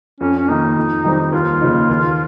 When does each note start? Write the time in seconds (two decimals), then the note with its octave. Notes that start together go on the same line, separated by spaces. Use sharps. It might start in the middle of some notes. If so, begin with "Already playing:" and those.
0.20 F2 C#4
0.39 C#4
0.49 D#3 A#3 D#4
0.77 F2
1.04 D#3 G3 C4
1.32 D#2 F4
1.61 C#3 F3 A#3 D#4
1.89 D#2